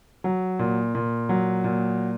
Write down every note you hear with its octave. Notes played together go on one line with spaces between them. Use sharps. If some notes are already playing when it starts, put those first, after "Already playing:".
F#3
A#2
A#2
F#3
A#2